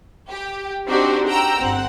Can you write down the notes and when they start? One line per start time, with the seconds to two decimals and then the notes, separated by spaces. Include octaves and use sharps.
0.29 G4
0.88 C4 D4 D#4 F#4 G4 C5
1.27 F#5 G5 A#5 E6
1.58 G1 C4 F#5